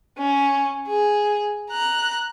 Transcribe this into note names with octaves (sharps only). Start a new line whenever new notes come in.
C#4
G#4
A#5 F#6